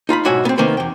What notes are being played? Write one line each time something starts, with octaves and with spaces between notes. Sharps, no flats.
D#4 F4 A#5 B5
B1 G#2 F#4 C#5 E5 G#5
B3 C4
C3 D#3 A#3 C4 B4
E2 G5